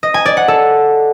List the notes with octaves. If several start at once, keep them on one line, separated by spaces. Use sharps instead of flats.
D#5
G#5
D5
F#5
A4